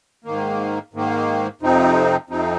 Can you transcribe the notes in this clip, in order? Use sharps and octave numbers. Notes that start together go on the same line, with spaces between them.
G#2 D#3 A#3
G#2 D#3 A#3
F2 C3 F3 C4 D#4
F2 C3 F3 C4 D#4